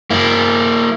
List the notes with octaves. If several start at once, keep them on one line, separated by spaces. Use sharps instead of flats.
A#3 E4